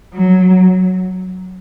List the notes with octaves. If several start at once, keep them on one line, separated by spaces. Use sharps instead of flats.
F#3